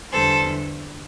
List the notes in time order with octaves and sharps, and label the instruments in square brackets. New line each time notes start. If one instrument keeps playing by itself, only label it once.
[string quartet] E2 D3 G3 A4 C5